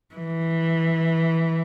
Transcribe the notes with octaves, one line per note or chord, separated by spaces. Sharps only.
E3